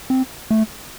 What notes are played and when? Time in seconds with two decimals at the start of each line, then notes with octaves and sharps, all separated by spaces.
0.10 C4
0.51 A3